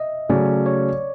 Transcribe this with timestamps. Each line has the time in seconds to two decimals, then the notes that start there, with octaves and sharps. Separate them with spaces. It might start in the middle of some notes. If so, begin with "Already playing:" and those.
Already playing: D#5 E5
0.29 C#3 F#3 A3 C#4 D5
0.66 C#5